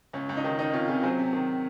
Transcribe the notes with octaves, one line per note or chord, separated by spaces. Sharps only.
C#2 C#4
C#2
D#4
D#3
D#3 D#4
C3 C#4 F4
C3 F4 G#4
F#3 G#4 C5
C3
D#3